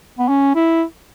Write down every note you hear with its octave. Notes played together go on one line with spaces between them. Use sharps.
B3
C#4
E4